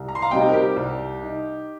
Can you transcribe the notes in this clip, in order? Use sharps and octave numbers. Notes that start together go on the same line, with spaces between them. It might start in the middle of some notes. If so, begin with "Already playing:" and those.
Already playing: C2
A#5
C6
F5 A#5
C3 G3 C4 D#4 D#5 G5
A#4
G4
C2
D#4